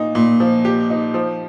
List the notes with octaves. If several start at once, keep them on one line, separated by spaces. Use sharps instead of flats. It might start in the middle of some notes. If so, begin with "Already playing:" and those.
Already playing: A#2 D#4
A#2
F3
G4
D#4
F3